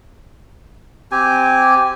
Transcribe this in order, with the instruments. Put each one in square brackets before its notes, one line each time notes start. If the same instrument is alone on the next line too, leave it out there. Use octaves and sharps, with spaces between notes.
[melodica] C4 G4 G#5